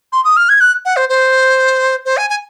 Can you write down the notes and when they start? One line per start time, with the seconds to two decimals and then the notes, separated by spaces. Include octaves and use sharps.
0.13 C6
0.25 D#6
0.37 F6
0.49 G#6
0.61 F#6
0.85 F#5
0.96 C5
1.09 C5
2.05 C5
2.17 G#5
2.30 G#5